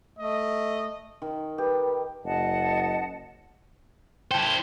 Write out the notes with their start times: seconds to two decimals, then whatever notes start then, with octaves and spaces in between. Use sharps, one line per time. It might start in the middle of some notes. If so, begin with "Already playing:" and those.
0.18 A3 D#5
1.22 D#3
1.58 G4 B4
2.25 F#1 D#5 F#5 A5
4.31 E4 C5 G5 A5